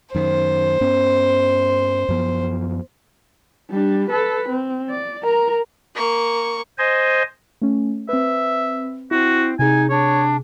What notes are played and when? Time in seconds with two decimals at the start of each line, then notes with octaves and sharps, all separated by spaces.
0.15 F#2 D#3 C5
0.81 G2 B3 C#4
2.09 F#2 F3 B3
3.70 G3 D4
4.10 A4 B4
4.49 C4
4.89 D5
5.23 A#4 A#5
5.95 A#3 C#6
6.78 C5 D#5 G#5
7.62 A3 C#4
8.09 C4 B4 E5
9.11 C4 E4 F#4
9.59 C3 D#4 G#4 G#5
9.90 D4 C#5